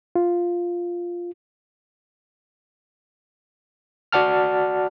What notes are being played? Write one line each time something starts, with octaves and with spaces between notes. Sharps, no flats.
F4
F#4 D5 F#5 A5 F6